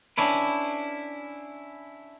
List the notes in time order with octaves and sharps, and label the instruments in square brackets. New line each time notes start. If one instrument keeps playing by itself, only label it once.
[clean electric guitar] C#4 D4 E4 B4